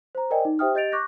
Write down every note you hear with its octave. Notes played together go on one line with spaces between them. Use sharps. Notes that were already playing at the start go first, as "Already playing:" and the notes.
C5 A#5
A#4 C5 D5 D#5 G5 G#5
D#4
G4 C5 E5 G5 D#6 F6
G4 D#5 G6 A6 D7 F7
C#6 D6 F#6 G6 A#6